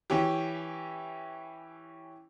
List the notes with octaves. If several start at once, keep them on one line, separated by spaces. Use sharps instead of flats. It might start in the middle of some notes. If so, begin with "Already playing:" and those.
E3 C#4 E4 G4